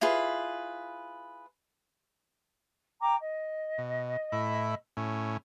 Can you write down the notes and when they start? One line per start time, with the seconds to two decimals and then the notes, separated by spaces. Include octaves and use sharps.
0.01 E4 F4 G#4 B4
3.02 G5 A#5 D6
3.19 D#5
3.78 B2
4.32 A2 E4 B5
4.97 A2 C#4